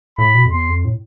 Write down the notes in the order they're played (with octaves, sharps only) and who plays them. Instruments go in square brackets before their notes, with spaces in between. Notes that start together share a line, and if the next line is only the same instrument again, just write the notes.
[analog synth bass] A2 [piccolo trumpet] B5
[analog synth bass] B2
F2
[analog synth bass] E2 [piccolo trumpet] C6
[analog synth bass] F2
A2